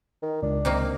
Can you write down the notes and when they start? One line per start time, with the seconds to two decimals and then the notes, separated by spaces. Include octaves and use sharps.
0.23 D#3
0.43 C#2 D4
0.65 C3 D#3 A#3